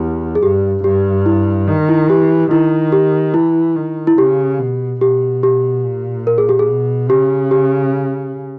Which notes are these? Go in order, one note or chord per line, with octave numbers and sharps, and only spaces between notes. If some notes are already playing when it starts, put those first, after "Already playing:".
Already playing: E2 G4
G#4
G2 G4
G2 G4
E4
D#3
E4
E3 G4
D#3 E4
G4
E3 E4
D#3
E4
C#3 G4
B2
B2 G4
G4
A#2
A#4
G#4
G4
G#4
B2
C#3 G4
G4